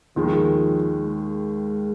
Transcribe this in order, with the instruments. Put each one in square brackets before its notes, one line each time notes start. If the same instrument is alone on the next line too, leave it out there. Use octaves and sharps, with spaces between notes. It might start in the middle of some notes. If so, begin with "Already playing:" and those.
[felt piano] D#2 D#3 G#3 [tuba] F3
[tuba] G#3